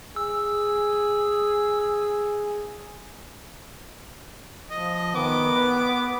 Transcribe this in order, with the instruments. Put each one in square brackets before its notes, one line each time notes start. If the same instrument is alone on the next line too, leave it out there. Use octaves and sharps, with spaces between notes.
[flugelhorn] G#4 [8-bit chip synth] E6
[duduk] F3 [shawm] D#5
[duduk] D#3 [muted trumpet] B3 [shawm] D6
[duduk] B4